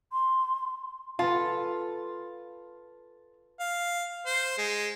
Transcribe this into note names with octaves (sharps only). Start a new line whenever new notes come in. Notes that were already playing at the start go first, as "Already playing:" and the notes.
C6
F4 A4 B4 A5
F5
C5
G#3